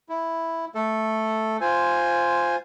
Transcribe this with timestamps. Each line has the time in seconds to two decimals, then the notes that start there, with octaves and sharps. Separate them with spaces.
0.09 E4
0.75 A3 A4
1.61 F4 C5 G#5